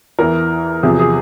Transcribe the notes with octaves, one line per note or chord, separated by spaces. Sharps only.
E2 E3 A#4
E2 C3 F3 G#4
G#4